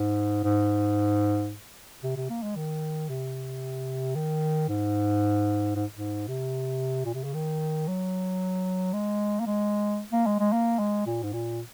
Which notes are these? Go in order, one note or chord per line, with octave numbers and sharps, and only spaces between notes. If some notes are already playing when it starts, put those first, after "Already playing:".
Already playing: G#2
G#2
C3
C3
A#3
G#3
D#3
C3
D#3
G#2
G#2
G#2
C3
A#2
C3
C#3
D#3
F#3
G#3
A#3
G#3
A#3
G#3
G#3
A#3
G#3
A#2
G#2
A#2